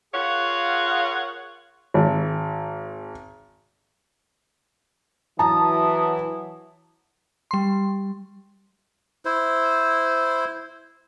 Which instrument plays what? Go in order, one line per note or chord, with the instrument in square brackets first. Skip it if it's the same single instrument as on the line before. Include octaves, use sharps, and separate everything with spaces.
[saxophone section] F4 G#4 A#4 C#5 F5 F#5
[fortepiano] G#1
[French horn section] E3 F#3 E4 [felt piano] A5 A#5 [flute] D#6
[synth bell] G3 C6
[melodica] E4 C5